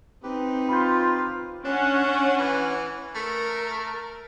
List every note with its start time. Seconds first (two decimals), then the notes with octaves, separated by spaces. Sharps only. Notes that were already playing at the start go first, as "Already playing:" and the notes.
0.23 C4 D#4 G4 B4
0.69 F4 B5 C6 G6
1.65 C#4 D4 F#5
2.38 E3
3.15 A3 A#4